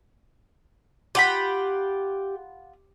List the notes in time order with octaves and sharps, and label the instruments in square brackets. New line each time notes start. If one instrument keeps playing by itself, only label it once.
[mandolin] F4 F#5 B5 [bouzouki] G4